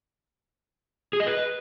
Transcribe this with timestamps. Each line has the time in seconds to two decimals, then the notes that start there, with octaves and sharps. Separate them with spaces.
1.13 G#4
1.20 D#5
1.27 B4